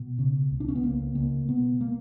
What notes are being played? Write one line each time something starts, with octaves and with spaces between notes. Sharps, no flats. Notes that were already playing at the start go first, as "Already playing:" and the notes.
Already playing: B2
C#3
C#2
D4
C#4
B3
C#2 A#3
C#3 A#3
B2 B3
A#3